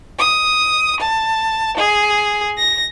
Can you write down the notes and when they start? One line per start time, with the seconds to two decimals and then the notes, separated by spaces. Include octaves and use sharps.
0.17 D#6
1.00 A5
1.78 G#4
2.57 A#6